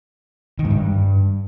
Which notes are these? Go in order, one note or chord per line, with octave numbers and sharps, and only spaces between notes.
D#3
G#2
G2